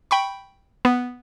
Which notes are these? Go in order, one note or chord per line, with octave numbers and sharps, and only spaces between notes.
G5 B5 C#6
B3